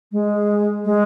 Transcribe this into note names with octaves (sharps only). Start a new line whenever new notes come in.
G#3
G#3